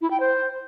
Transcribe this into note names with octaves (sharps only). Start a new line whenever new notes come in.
E4
G5
C5